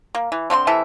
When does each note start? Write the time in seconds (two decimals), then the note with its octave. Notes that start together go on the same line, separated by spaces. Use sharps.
0.15 A#3
0.32 E3
0.50 D3 C4 F4 C6
0.67 C3 E3 A4 E5